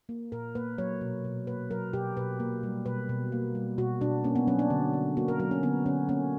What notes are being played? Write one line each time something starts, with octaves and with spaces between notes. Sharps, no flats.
A#3
A#2 A#4
A#3 B4
F#3 C#5
B2
B2
A#3 B4
F#3 A#4
B2 G4
B2 B4
A#3
G3
B2 B4
B2
A#3
G3
B2 F#4
B2 D4
A#3 C#4
B3
F#3 C#4
D4
D3
D3
A#3 F#4
A#4
F#3 A#4
C#4
D3 B3
D3 C#4
A#3 C#4